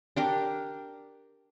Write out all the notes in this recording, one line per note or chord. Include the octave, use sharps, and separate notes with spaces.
D4 G4 A#4